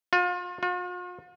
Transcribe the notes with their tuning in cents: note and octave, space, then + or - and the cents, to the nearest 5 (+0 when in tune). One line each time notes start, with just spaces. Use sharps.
F4 +35
F4 +45